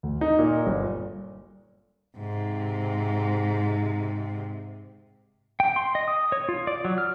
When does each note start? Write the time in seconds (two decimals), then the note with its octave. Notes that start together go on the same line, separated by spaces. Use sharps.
0.03 D2
0.21 D#4
0.39 A#2
0.66 G1
2.18 G#2 C3
5.60 G5
5.76 C6
5.95 D#5
6.08 D#6
6.32 C#5
6.49 F4
6.67 D5
6.85 F#3
6.98 F6